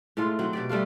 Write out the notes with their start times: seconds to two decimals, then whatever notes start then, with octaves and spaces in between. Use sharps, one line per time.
0.17 A2 G#3 A3 F4
0.39 D#3 F#3 C4
0.53 B2 G4 D5
0.69 G3 A3 D4 F4